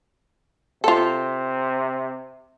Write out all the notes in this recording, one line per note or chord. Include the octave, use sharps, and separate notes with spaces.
C3 F4 A4